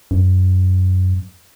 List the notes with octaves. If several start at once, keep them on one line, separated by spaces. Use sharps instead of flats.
F#2